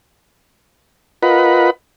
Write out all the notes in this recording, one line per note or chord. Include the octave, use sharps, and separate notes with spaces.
F4 A#4 B4 D#5 F#5 B5